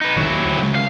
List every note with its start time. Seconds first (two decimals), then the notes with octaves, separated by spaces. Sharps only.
0.01 D#4 B4
0.16 F1 A#1 D#3 F#3 E4
0.30 D#2
0.44 D2
0.59 C#3 G#3
0.75 F5